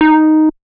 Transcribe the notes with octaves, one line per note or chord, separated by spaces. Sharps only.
D#4